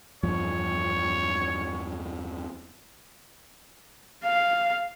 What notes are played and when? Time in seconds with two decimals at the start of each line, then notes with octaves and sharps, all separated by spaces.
0.23 E2 G2 F3 C#5
4.25 F5